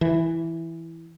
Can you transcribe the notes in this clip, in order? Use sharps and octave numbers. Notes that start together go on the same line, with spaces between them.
E3